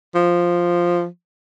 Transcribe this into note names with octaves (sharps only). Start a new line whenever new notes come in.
F3